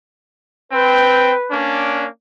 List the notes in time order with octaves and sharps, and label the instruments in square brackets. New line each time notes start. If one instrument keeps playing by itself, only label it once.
[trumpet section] C4 G5 [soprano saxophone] B4
[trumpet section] A#3 C#4 D4